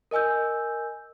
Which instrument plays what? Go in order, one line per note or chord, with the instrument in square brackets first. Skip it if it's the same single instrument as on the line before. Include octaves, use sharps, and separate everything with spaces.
[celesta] A#4 D#5 G#5 E6 G6